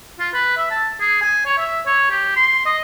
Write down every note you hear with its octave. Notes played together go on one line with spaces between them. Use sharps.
F4
B4
E5
A5
G#4
G#5
C#5
E5
C#5
G4
C6
D#5